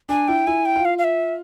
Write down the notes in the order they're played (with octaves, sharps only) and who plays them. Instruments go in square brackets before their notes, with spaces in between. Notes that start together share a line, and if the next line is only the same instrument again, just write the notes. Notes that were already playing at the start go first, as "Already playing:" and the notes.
[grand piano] D4 [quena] G#5
[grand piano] E4 [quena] G5
[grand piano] E4 [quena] G#5
[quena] G5
[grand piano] F4
[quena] F5
F5
E5